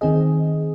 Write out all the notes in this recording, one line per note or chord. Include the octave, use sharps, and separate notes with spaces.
D#3 C4 G#4 D#5